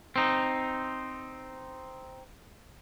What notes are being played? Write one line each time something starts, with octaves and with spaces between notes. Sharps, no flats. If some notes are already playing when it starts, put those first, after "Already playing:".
C4 D#4